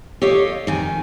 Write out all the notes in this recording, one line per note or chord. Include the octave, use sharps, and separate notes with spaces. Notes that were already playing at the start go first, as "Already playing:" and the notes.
G4 A4 C#5 D#5 F5
F2 D#3 G#5